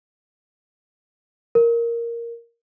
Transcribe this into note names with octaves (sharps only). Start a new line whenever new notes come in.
A#4